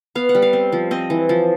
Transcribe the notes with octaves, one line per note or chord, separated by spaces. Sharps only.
B3 F5
F#5
G3
F5
C4
F3
C4 D#5
E3
F3